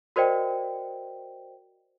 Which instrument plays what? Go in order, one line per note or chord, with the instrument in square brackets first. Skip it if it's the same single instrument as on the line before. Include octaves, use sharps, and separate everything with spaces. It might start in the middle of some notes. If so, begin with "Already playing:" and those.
[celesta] F#4 A#4 C5 D5 D#5 G5